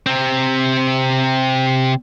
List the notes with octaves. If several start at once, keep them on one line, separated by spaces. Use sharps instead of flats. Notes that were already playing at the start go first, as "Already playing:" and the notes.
C3 C4